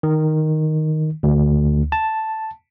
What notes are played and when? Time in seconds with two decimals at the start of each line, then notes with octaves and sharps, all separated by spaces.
0.03 D#3
1.23 D2
1.92 A5